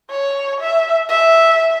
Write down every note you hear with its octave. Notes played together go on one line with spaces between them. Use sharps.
C#5
E5
E5